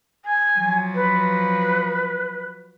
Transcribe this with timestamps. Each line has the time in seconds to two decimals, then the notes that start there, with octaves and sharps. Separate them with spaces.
0.25 G#5
0.58 F3 F#3
0.94 B4